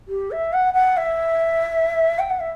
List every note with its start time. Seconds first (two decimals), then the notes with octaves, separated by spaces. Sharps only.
0.08 G4
0.31 E5
0.53 F#5
0.74 F#5
0.97 E5
2.19 G5
2.30 F#5
2.40 E5